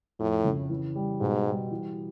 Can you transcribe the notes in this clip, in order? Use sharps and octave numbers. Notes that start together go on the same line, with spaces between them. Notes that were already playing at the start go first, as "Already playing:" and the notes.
F2 A2
C#3
E3
G3
G#2 B2
G3
E3